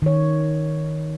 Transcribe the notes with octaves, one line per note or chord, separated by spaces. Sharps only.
D#3 C#5